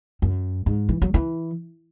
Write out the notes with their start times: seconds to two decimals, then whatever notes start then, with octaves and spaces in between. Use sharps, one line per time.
0.22 F#2
0.66 G#2
0.89 E3
1.02 F#3
1.14 E3